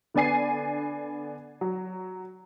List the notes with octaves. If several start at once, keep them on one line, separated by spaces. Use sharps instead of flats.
D3 B3 D5 G#5 C7
F#3